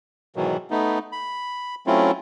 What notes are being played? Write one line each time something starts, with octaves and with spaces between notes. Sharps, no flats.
G#2 B2 D#3 E3 F#3
A3 B3 D#4
B5
F#3 A3 C4 C#4 E4 F4